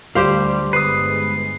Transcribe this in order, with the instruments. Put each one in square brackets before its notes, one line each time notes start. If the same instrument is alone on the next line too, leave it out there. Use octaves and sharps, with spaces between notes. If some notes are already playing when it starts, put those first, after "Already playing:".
[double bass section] D2 [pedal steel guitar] G3 [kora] G4 C5 F5
[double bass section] G1 G#3 [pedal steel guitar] B4 D#6 [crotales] C7